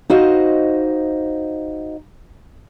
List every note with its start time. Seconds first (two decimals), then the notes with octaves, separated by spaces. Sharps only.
0.10 D#4 F#4 C5 D#5 F5